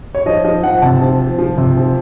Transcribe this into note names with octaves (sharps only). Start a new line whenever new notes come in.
C#5
F3 D#5
F3 D#5
F3 F#5
C3 A5
F3
F3
F3
C3
F3